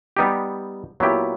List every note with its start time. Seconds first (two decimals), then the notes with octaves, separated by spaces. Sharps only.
0.17 G3 B3 D#4 G4
1.00 A#2 F#3 B3 E4 G4